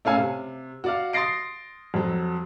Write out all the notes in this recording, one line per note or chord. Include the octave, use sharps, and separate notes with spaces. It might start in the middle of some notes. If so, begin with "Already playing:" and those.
A3 C#4 F5 G#5 E6
C3
F#4 D5 F5
C6 D#6 A6 A#6 C7 D7
F2 F#3